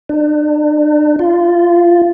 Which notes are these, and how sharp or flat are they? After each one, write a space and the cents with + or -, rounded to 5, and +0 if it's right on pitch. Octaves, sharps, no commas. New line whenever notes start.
D4 +40
F4 -15